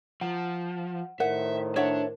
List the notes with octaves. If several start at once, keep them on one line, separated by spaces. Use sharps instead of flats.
F3 F#5
A2 D#3 A#4 C5 E5 F#5
D4 C#5 E5 F#5